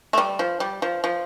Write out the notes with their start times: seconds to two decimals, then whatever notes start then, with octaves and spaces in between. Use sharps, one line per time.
0.13 A3
0.18 G3
0.39 F3
0.60 G3
0.82 F3
1.04 F3